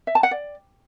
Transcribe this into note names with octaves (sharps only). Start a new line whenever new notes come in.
E5
A5
F#5
D5